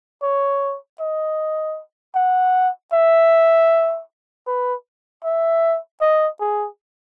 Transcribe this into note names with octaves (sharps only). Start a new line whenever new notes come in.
C#5
D#5
F#5
E5
B4
E5
D#5
G#4